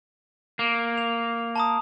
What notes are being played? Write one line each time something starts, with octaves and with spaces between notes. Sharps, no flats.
A#3
F7
A5 A#5 D#6